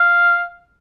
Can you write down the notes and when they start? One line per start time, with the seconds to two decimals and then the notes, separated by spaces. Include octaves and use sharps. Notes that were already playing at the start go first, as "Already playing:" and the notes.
Already playing: F5